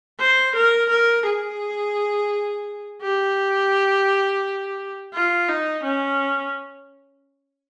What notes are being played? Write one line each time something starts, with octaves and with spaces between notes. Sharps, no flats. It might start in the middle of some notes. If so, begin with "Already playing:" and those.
C5
A#4
A#4
G#4
G4
F4
D#4
C#4